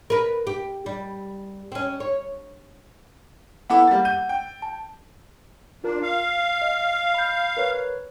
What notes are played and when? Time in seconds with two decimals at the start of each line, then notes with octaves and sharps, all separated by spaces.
0.10 A#4 B4
0.47 G4
0.86 G3
1.72 C4 C#4
2.00 C#5
3.70 B3 E4 A4 F#5 D6
3.87 G3 A#3 A6
4.05 G6 D#7
4.29 G5
4.62 A5
5.84 D4 F4 A#4
6.03 F5 C7
6.62 D#5
7.14 B5 G6
7.57 A#4 B4 C#5